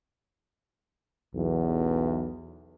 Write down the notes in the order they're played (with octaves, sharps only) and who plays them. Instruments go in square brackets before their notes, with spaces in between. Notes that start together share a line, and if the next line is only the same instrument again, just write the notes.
[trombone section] B1 E2